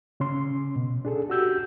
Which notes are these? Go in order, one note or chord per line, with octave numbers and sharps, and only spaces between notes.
C#3 C#4 C6
B2
D4 G#4 A4
F#4 G4 E6 G6